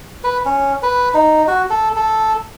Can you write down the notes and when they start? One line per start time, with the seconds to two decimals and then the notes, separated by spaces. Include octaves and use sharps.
0.24 B4
0.45 C#4
0.82 B4
1.14 D#4
1.48 F#4
1.70 A4
1.96 A4